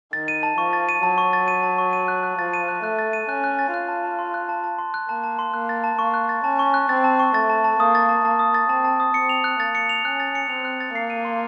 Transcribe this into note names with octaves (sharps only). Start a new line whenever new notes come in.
D#3 A6
D#7
A5
F3 C#6
A6
D#7
F#3 A5
C#6
A6
D#7
A5
C#6
D#7
F#6
F#6
F3 A6
D#7
F#6
A3 F#6
A6
D#7
C#4 F#6
F#6
A6
F4 F#6
A5
A5
C6
F#6
A5
A5
C6
F#6
A#3 A5
A5
C6
A#3 F#6
A6
A5
A#3 C#6
F#6
A6
C#4 A5
C#6
F#6
C4 A6
A5
C#6
A3 A6
A5
A5
A#3 D#6
A6
A5
A#3 A5
D#6
A6
C4 A5
A5
D#6
C4 C#7
F7
F#6
A#3 A6
C#7
F7
C#4 F#6
A6
C#7
C4 F7
F#6
A6
A#3 C7
D#7
C6